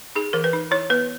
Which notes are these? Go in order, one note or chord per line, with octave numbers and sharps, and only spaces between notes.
D#4 G#4
E3 A#4
B4
D#4
E4 C#5
B3 B4